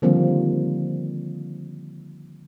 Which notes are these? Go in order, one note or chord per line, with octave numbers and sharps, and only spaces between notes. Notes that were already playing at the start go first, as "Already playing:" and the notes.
D3 D#3 F3 G3 A#3 C4